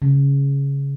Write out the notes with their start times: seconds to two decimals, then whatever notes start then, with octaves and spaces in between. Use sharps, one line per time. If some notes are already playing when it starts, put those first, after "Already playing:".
0.02 C#3